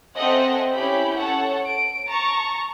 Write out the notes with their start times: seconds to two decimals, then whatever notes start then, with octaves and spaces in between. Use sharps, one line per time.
0.15 C4 A4 D#5 E5 F#5 G#5
0.74 C#4 E4 G4 B5 G6
1.18 A4 C#5 F#5
1.66 D7
2.07 A5 A#5 C#6